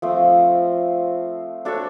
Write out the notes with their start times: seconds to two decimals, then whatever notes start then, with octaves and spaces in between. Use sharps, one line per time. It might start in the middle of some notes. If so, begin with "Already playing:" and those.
0.02 F3 A3 C4
1.65 D4 F#4 A4 C#5